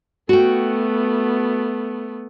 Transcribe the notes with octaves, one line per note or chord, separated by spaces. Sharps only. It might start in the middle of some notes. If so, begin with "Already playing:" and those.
A3 B3 F#4 G5